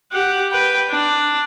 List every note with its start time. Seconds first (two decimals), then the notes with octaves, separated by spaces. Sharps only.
0.12 G4 F#5
0.51 B4 G5
0.90 D4